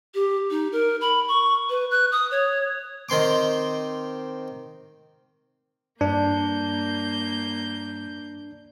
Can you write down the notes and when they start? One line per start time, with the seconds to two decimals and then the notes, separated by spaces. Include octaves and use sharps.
0.14 G4
0.50 D#4
0.72 A#4
1.01 B5
1.28 C#6
1.70 B4
1.91 F#6
2.12 D#6
2.31 C#5
3.09 D#3 C4 C6 D6
6.01 G2 A#3 D4 G6